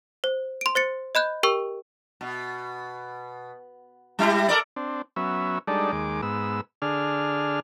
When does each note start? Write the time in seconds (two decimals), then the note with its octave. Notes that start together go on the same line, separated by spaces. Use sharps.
0.24 C5
0.61 C6 D7
0.75 C5 A6 C#7
1.15 D#5 B5 F#6 G6
1.43 G4 A#4 G5 C#6 E6
2.21 B2
4.19 G3 E4 G4
4.49 A4 A#4 D5
4.76 C4 D4
5.16 F#3 B3 C#4 E5
5.67 G3 G#3 D4 D#4 A4 D5
5.92 D#2 G#3 D6
6.22 G#2 B3 E6
6.82 D3 D4 G#4 F6